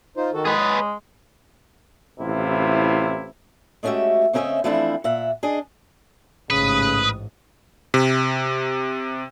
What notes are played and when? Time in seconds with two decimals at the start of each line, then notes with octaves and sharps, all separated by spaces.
0.17 D#4 F4 C5
0.34 D#3 F#4 A4
0.45 G#3 G#4 B4
0.59 C#5
2.20 A1 C3 E4 F4
3.83 G#3 A3 C#4 F#4 G4 E5
4.33 C#3 C4 C#4 A#4 D#5 E5
4.64 E3 F3 A3 C4 D4 E4
5.04 A#2 E5 F#5
5.43 D4 G#4 D#5
6.50 A1 G#2 C#3 B4 D#6
7.94 C3